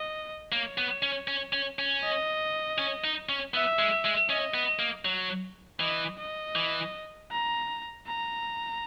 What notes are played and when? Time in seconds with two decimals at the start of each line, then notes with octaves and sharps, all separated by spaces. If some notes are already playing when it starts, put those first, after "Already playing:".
Already playing: D#5
0.52 A#3 C#5
0.78 B3
1.03 C#4
1.28 C#4
1.53 C#4
1.79 C#4
2.03 D#5
2.78 C#4
3.04 D#4
3.29 C#4
3.54 B3 E5
3.79 G#3
4.05 G#3
4.29 C#4 D#5
4.54 B3
4.79 A#3
5.05 F#3
5.80 E3 D#5
6.18 D#5
6.56 E3
7.31 A#5
8.06 A#5